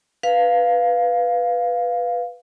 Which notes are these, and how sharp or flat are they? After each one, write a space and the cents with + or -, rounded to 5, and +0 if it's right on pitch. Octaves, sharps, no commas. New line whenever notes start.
B4 +0 F5 +0